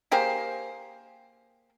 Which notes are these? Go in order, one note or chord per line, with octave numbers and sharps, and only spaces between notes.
A#3 G4 G#4 C5